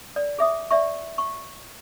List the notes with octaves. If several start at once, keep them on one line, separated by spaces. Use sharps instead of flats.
D5
G#4 E5 D#6
D5 E5 C#6
C#6